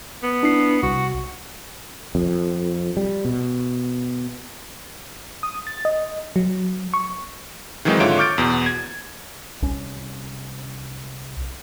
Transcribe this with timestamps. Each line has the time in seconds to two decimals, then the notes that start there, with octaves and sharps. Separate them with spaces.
0.23 B3
0.43 D4 E4 C7
0.83 C2 F#4
2.15 F2
2.97 G3
3.25 B2
5.43 D#6
5.67 A6
5.85 D#5
6.36 F#3
6.94 C#6
7.85 D#3 E3 F#3 G#3 C4 D#4
8.00 G#2 D3 F4 C#5 E5 D7
8.18 C#6 D6 F6 G6 A6 D7
8.38 E2 B2
8.66 G#6
9.62 C2 C#4